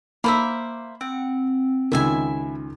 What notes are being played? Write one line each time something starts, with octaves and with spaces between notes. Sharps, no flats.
A#3 A#4 C5 E5 B5
C4 F#5
C#2 D#3 E4 E5 G#5